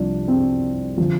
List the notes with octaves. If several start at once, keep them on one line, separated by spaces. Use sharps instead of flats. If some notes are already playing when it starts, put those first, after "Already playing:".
Already playing: C2 C3 F3 D4
C4
D3 F3